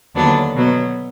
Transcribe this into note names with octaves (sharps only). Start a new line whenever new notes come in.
D#2 D3 F#3 B3 D4
B2 F#3 B3